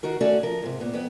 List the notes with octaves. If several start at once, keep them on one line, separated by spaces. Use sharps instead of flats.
D#3 D#4 F#4 A#4
A3 C#4 F#4 A4 D5
F3 A#4
G#2 C3
A#2 B3
F2 B3